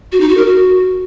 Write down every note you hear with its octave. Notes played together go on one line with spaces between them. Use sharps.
F#4
D#4
F#4
A#4
F#4